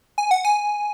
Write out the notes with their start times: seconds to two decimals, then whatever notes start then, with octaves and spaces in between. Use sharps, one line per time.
0.18 G#5
0.31 F#5
0.45 G#5